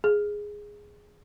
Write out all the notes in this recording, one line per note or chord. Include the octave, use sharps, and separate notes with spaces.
G#4